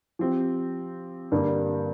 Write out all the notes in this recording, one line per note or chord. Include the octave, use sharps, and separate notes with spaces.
F3 C4 G4
G2 D3 G3 A#3 D4